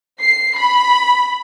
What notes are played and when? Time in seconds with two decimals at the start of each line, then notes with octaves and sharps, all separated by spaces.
0.21 C7
0.58 B5